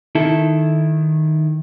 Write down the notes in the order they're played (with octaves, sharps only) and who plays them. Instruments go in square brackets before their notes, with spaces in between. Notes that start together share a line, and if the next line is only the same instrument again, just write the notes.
[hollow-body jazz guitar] D#3 E4 A4